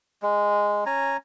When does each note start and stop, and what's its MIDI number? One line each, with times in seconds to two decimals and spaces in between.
0.22 0.84 56
0.86 1.17 61
0.86 1.17 80
0.86 1.17 82